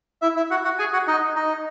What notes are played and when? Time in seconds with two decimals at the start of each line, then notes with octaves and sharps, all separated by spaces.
0.22 E4 E5
0.36 E4 E5
0.51 F#4 F#5
0.64 F#4 F#5
0.79 G#4 G#5
0.93 F#4 F#5
1.08 D#4 D#5
1.36 D#4 D#5